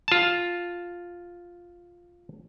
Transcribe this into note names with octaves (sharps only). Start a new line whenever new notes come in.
F4 A5